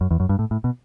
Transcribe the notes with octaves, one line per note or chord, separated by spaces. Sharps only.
F#2
E2
F#2
G2
A2
A2
B2